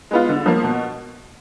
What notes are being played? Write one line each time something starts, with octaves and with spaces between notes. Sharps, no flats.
G#3 B3 F4
D3
F3 A#3
B2